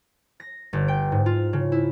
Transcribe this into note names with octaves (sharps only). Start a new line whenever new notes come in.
A#6
G1
G5
G#2
F4
C#3
E4